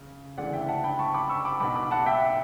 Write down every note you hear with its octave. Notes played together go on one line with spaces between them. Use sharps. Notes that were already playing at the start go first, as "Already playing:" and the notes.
Already playing: C#3
D2 C#3 E3 D5 F#5
E5 G5
F#5 A5
G5 B5
A5 C#6
B5 D6
C#6 E6
B5 D6
B1 B2 B5 D6
B5 D6
F#5 A5
E5 G5